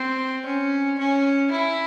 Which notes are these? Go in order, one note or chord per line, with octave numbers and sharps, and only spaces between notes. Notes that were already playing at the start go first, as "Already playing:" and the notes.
Already playing: C4
C#4
C#4
E4